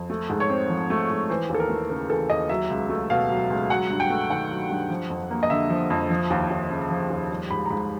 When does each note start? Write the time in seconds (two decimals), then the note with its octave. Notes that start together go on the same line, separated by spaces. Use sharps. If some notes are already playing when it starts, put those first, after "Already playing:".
Already playing: F2
0.10 A3
0.30 G#2
0.40 C#5
0.50 C4
0.70 F3
0.90 A3
1.10 G#2
1.30 E3 C5
1.50 D#2 A4
1.60 A#4
1.70 A3
1.90 C#3 A#4
2.10 E3 A4
2.30 D#2 D#5
2.50 F#3 E5
2.70 C#2
2.89 A3
3.10 B2 F5
3.30 F#3
3.50 C#2
3.70 F#3 F#5
3.90 G2
4.00 G5
4.10 A3
4.30 D#3 F#5
4.50 F#3
4.70 G2
4.90 F3
5.10 F2
5.31 A#3
5.43 D#5
5.50 D3 E5
5.70 F3
5.90 F2
6.10 F3
6.30 D#2
6.50 D#2
6.70 C#3
6.90 F3
7.10 D#2
7.30 G3
7.50 G#2 B5
7.66 A#5
7.70 G#2 B5